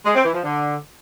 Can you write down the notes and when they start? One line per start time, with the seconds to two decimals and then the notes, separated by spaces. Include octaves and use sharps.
0.05 G#3
0.14 C4
0.24 E3
0.34 F3
0.43 D3